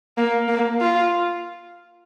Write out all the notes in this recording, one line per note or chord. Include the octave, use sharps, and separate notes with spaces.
A#3
A#3
F4